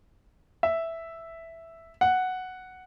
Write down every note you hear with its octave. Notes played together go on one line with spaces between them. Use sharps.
E5
F#5